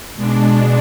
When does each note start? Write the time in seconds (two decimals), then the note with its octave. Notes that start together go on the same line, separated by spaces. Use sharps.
0.17 B2 G#3 D4